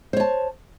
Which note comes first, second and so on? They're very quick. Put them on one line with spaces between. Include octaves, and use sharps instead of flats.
C5 C#5 A5